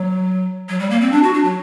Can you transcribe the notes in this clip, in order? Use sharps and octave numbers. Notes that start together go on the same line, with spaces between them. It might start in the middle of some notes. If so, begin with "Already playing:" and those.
Already playing: F#3
F#3
G3
A#3
C4
D4
F#4
D4
F#3